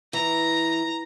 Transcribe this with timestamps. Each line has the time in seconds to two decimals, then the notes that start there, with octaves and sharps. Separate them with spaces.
0.13 E3 A#5